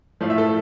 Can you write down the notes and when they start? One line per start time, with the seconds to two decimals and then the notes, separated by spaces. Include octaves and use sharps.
0.21 A2 F3 A3 F5
0.30 E5
0.38 A4